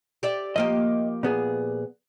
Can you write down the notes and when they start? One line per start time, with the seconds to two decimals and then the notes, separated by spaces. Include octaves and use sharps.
0.23 G4 D5 E5
0.56 F3 A#3 G4 D#5
1.23 A#2 B3 G#4